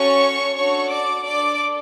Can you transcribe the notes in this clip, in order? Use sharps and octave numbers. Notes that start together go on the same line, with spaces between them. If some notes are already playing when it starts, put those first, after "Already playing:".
Already playing: C#4 F#4 A4 C#5 C#6
D4 F#4 A4 C#5 C#6
D5 D6
D4 A4 D5 D6